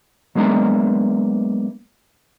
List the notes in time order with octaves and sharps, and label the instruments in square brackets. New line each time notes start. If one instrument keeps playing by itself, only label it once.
[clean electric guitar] F#3 G#3 A#3 B3 D4 A#5